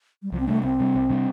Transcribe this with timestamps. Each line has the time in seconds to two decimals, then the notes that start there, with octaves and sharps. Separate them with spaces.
0.22 G3
0.32 C2 F3
0.40 C4
0.47 C3 G3 A3 D4
0.63 C2 C4
0.79 C3 G3 D4
0.95 C2
1.10 C3 G3 D4